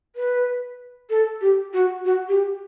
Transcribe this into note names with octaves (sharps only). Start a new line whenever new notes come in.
B4
A4
G4
F#4
F#4
G4